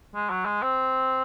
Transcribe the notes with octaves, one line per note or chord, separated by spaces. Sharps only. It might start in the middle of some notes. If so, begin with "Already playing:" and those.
G#3
F#3
G#3
C4